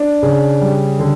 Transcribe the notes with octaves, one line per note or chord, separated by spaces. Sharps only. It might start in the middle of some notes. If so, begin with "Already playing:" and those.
Already playing: D4
C#3
G3
D3